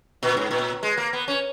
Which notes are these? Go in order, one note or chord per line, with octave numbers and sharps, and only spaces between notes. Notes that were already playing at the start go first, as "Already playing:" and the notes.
A#2
G#2
A#2
G#3
A#3
B3
C#4